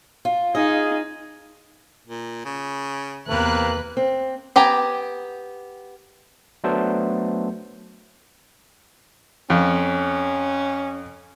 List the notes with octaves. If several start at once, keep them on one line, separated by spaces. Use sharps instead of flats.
F4
D#4 F4 G#4 D#5 G#5
A#2
C#3
E2 C3 A#3 B4 F#6
C4
B3 G4 G5 G#5 A#5
F#3 A3 B3 D4 A4 C5
F2 C#4